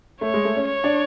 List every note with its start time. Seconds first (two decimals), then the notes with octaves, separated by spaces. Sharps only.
0.21 A3 C#5
0.34 G#3
0.45 A3
0.56 C#4
0.68 C#5
0.84 D4